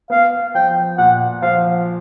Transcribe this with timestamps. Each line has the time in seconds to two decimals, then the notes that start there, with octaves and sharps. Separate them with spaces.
0.10 B3 F5
0.55 F3 G5
0.98 A#2 F#5
1.42 F3 F5